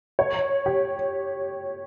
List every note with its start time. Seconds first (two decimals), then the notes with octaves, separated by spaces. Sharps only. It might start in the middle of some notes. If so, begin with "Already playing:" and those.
0.19 C#5
0.66 G4